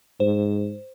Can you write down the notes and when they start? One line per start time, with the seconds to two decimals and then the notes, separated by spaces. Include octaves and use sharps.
0.20 G#2 C5